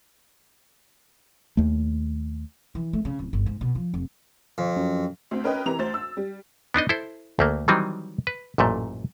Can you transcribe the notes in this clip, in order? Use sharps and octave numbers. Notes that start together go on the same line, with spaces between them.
D#2 A3
E3
A3
C#3
D1
G1
G#2
B2
F3
F1
F2
F#2
D2 C4
C#4 A#4 B4 D#5 G5
C3 E3 A#5 F7
D2 C5 A6
E6
G3
B3 D4 D#4 D#5
E4 A4 C5
D2 A3 A#3
D#3 E3 F#3 G3 C4 D#4
B4
A1 F#2 A#2 A3